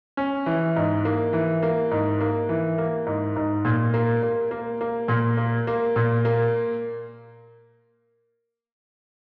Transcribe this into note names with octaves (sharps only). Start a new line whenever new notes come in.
C#4
E3
G#2
A#3
E3
A#3
G#2
A#3
E3
A#3
G#2
G#2
A#2
A#3
A#3
A#3
A#3
A#2
A#3
A#3
A#2
A#3